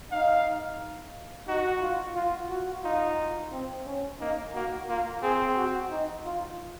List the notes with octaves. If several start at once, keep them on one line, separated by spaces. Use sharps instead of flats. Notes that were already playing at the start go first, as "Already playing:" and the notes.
D#4 F5
D#4 F#4
F4
F4
F#4
D#4 F4
C4
C#4
A#3 D#4
A#3 F#4
A#3 F4
C4 G#4
F#4
D#4
F4